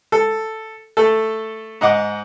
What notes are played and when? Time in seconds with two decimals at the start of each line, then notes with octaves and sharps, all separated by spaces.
0.12 A4
0.97 A3 A4
1.81 G#2 D#5 F#5 D6